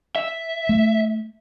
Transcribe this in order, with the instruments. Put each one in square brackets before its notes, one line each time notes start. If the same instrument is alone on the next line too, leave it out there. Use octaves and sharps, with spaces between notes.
[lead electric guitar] E5
[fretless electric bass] A3